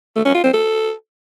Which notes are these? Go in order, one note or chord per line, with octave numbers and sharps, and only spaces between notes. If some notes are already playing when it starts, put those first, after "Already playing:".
A3
C#4
F4
C4
A4